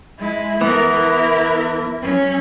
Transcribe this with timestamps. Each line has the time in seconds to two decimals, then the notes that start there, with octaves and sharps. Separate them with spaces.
0.18 G#3 E4
0.61 E3 A3 B3 A#4
0.91 E4 A#4
2.02 F#3 C#4